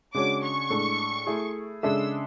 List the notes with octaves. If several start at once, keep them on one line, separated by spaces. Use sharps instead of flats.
C#3 G#3 D4 F#4 C#5 D6
C#6
A2 G#3 D4 A4
A3 E4 G#4
C#3 G#3 D4 A4 E5 E6